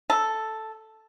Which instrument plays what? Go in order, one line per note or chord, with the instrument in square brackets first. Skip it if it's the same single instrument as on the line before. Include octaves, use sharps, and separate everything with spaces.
[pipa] A4